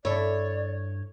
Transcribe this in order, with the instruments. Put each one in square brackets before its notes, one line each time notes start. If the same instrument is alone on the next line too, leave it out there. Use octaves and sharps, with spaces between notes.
[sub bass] G2 [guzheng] E4 A4 [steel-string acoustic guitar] C#5 [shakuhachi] D5